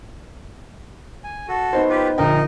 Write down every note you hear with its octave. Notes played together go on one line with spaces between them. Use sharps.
G#5
F#4 A4
B3 D#4 C5
F4 G4 B4
A#1 D3 D#4 A#4 D#5 G5